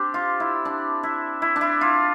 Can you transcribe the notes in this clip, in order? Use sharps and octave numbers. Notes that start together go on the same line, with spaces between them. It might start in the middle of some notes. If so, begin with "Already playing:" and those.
Already playing: C4 D4 G4
F4
E4
D4
E4
E4
D4
E4
F4